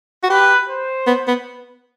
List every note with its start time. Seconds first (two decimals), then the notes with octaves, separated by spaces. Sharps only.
0.23 F#4
0.30 G4 B4
0.69 C5
1.07 B3
1.28 B3